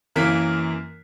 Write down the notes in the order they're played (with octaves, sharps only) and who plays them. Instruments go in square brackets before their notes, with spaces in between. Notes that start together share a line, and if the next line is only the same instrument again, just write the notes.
[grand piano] F#2 E3 A#3 A#4 B6